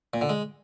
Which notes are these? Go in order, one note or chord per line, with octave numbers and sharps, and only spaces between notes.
A#2
D3
G#3